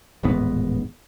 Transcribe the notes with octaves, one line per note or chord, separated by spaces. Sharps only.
D#1 A1 G#2 B3